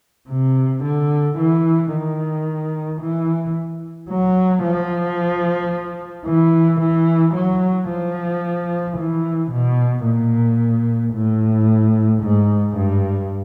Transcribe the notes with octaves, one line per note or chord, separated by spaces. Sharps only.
C3
D3
E3
D#3
E3
F#3
F3
E3
E3
F#3
F3
E3
B2
A#2
A2
G#2
G2